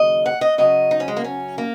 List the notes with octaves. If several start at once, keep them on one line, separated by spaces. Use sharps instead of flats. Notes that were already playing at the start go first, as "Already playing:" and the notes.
Already playing: D#2 C#3 F#3 D#5
F#5
D#5
F#2 C#3 F#3 D#5
D#4
C#4
G#3
A#3
C#4
A#3